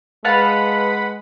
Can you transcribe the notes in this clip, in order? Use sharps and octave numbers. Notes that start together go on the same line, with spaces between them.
G#3 B4 F5 F#5 A5 B5